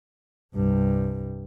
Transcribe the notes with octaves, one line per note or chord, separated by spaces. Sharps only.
C2 G2